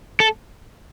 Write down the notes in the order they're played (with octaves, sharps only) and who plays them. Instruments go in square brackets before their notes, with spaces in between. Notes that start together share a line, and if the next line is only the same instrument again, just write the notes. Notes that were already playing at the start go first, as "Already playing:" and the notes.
[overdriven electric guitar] A4